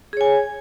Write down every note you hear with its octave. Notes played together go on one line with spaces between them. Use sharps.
G#4 C#5 G#5